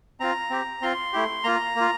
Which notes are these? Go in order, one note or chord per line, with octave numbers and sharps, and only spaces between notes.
C4 F4 A#5
C4 G4
C4 F4 C6
A3 E4 G4
A#3 F4 A#5
A#3 F4